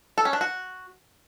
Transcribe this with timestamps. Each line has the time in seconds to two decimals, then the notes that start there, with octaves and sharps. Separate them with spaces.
0.18 A4
0.25 C#4
0.33 D4
0.41 F#4